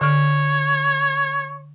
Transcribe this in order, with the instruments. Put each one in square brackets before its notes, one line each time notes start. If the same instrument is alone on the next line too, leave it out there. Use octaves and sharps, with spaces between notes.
[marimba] D3 C#6 F6 [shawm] C#5